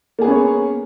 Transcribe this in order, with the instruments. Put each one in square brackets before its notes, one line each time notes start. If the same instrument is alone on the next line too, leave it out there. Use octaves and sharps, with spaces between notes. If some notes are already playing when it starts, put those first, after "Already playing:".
[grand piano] A#3
G#4
B3
C#4
C#5